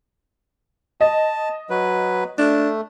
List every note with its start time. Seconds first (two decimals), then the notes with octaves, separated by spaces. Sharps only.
1.01 D#5 A5
1.70 F#3 B4
2.38 A3 D4